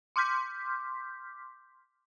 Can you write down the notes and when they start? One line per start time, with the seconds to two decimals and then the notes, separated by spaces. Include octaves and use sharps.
0.16 C6 D6 F6 G6 B6